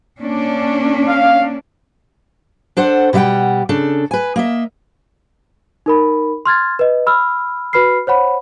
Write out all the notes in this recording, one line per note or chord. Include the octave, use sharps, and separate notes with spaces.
A#3 C#4 D4
F5
D4 A4 C5 F#5
B2 G3 E5 F#5 G5
C#3 D4 A4
B4 G#5
A#3 D#5 E5
D#4 A#4 B5
C6 F6 G#6 A6
B4 D#5
B5 E6 F6
F#4 B4 B5 F6 C7
C5 C#5 F#5 B5